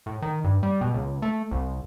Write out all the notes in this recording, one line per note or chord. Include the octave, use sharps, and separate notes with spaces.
A2
D#3
G2
G3
B2
C#2
A3
C2